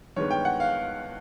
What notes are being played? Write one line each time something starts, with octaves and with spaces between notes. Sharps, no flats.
G2 D#3 G#3 B3 C#5
G5
F#5
F5